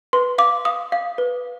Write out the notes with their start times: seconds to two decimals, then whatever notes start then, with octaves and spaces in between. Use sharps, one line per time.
0.13 B4 C6
0.38 F5 D6
0.65 F5 D#6
0.92 F5
1.18 B4